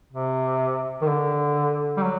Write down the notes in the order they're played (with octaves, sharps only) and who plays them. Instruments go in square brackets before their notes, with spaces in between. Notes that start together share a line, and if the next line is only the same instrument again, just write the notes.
[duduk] C3
D#3
D3
G3
F#3